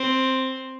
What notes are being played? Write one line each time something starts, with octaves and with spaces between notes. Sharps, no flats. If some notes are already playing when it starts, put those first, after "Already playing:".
Already playing: C4